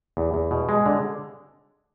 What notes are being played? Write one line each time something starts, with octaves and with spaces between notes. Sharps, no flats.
E2
E2
B2
G#3
D3